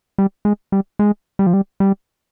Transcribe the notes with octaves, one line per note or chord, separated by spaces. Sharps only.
G3
G#3
G3
G#3
G3
F3
G3
G3